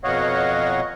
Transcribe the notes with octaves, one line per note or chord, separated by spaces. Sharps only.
F2 B2 C#5 D#5 F5 F#5